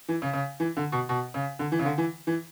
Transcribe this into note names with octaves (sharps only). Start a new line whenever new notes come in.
E3
C#3
C#3
E3
D3
B2
B2
C#3
D3
E3
C#3
D3
E3
E3